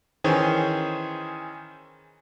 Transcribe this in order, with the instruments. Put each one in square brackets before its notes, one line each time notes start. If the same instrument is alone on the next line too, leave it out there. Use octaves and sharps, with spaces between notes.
[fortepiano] D#3 E3 C#4 G#4 C5 C#5